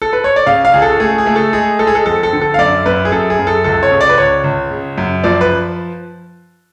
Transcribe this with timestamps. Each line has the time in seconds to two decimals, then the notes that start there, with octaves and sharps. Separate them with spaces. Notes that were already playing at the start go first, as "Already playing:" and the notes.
0.02 A4
0.13 B4
0.24 C#5
0.36 D5
0.46 C#3 F5
0.65 F5
0.74 C#2 G#4
0.82 A4
1.00 A3 G#4
1.18 G#4
1.26 A3
1.36 A4
1.53 G#3 G#4
1.79 G#3 A4
1.87 G#4
1.95 A4
2.06 F2 A4
2.23 A4
2.33 D3
2.42 A4
2.54 F5
2.58 F#2 D5
2.86 F#2 B4
3.05 G#4
3.12 F#2 A4
3.30 G#4
3.39 F#2
3.47 A4
3.64 C#2 A4
3.83 C#5
3.92 C#3
4.01 D5
4.10 B4
4.18 C#2 C#5
4.44 C#2
4.71 C#3
4.98 F#2
5.24 F3 D5
5.41 B4